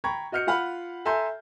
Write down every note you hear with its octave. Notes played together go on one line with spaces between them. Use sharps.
G5 A#5 B5 C#6 G#6
F#4 D#5 F6 G6 C#7
F4 F5 F#5 B5 F6
A4 E5 G#5 A#5 C6 G6